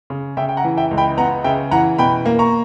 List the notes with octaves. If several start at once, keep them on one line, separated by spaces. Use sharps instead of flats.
C#3
C#3 E5 G5
G5
F#5 A#5
E3
E5 G5
C#2
G5 B5
B3 F#5 A#5
C#3 E5 G5
E3 F#5 A#5
B2 G5 B5
A#3
A#5 C#6